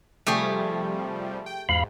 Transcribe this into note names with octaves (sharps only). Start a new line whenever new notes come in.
C3 F3 G3 A3 G4 G#4
G5
E2 G#2 F5 B5